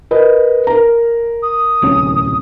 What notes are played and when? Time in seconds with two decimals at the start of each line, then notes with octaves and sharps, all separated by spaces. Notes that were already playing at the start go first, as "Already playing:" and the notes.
0.11 A#4 B4 D#5
0.67 A#4 A#5
1.43 D#6
1.82 D1 C2 C#4